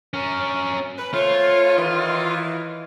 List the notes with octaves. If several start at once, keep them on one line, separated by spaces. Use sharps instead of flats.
C#4 A#4
B4
A3 F4 C5 C#5
D#3 E3